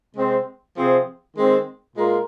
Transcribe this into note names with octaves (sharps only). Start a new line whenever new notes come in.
C3 G#3 C4
C3 F3 C4 G#4
D#3 G#3 C4
A#2 G#3 F4 A#4